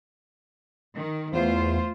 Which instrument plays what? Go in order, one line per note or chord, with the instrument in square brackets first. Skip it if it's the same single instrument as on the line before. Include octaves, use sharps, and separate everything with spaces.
[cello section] D#3
[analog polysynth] E2 [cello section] A3 F4 C5